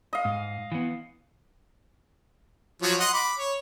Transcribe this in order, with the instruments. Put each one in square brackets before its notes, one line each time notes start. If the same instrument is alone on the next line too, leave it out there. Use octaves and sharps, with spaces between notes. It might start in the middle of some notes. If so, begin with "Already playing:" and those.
[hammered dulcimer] D#5 F5
[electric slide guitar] G#2
E3 B3
[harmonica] F3 F#3 C#5
D#5 F#5 C6
B5 D6
C#5